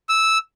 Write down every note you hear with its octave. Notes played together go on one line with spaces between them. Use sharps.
E6